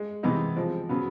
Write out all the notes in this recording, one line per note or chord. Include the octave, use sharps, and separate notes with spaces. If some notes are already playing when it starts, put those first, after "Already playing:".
Already playing: G#3
C3 E3 G#3 B3 D#4
F3 G#3 C4
C#3 F#3 B3